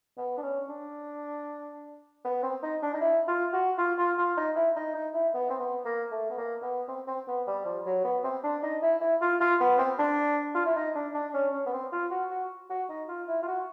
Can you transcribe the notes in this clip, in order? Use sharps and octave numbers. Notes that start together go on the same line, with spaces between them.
B3
D4
C#4
D4
B3
C4
D#4
D4
D#4
E4
F4
F#4
F4
F4
F4
D#4
E4
D#4
D#4
E4
B3
C4
B3
A#3
A3
B3
A#3
B3
C4
C4
B3
G3
F3
F#3
B3
C4
D4
D#4
E4
E4
F4
F4
B3
C4
D4
F4
E4
D#4
D4
D4
C#4
C#4
B3
C4
F4
F#4
F#4
F#4
D#4
F4
E4
F4
F#4